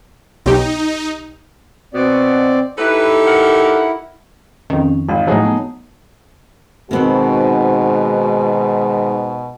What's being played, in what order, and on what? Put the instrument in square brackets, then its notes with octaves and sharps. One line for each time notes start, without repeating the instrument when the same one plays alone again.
[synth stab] B1 G4 [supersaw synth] D#4
[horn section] B2 [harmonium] C4 D5
[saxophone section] D#4 G4 A4 [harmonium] E4 [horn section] B4
[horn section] A#4 F#5
[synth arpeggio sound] F2 D#3 [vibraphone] C#4
[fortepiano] G#1 [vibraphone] F5
[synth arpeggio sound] A2 F3 [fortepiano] F#3 D#4 G#4
[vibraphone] B3 A5
[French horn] G#2 [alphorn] B2 [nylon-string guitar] D#3 B3 C4 [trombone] F#4